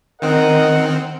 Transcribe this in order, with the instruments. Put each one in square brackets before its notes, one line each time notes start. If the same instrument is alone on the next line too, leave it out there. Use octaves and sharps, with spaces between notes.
[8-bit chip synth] D#3 C4 [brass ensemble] A#4 D#5 F#5